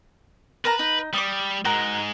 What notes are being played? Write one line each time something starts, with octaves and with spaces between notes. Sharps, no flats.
A#4 B4 A5 A#5
D#4
G3 D6 D#6
G#2 G#3 F#4 A#4 A#5